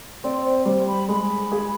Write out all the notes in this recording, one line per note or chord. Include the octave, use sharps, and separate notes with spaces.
C4 D5
C5
G3 C5
B5
G#3 B5
G#4